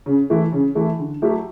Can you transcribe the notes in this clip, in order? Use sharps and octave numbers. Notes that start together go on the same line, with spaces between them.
C#3
E3 A3 E4
C#3
E3 A3 E4
D3
F#3 A3 E4 G4